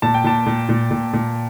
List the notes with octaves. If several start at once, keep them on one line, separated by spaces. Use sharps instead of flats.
A#2 A5
G5
A#2 A5
A#2
A#2
A#2
A#2